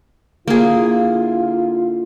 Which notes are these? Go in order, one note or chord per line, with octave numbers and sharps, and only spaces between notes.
D3 A#3 E4 F4 G#4